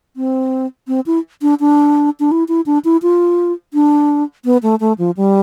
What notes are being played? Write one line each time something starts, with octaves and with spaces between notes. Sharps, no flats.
C4
C4
E4
D4
D4
D4
E4
E4
D4
E4
F4
D4
B3
A3
A3
F3
G3